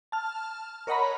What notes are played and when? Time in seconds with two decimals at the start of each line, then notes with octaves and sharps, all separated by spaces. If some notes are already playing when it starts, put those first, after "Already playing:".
0.12 A5 F6
0.87 A#4 C#5 D#5 F#5 A#5 B5